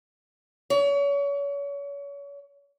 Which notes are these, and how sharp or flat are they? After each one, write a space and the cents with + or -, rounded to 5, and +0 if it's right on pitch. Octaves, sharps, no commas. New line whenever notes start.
C#5 +35